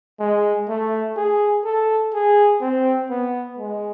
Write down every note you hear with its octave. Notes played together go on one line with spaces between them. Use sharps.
G#3
A3
G#4
A4
G#4
C4
B3
G#3